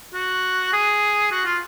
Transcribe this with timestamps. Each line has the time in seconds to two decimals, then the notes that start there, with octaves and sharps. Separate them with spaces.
0.14 F#4
0.73 G#4
1.32 F#4
1.45 F4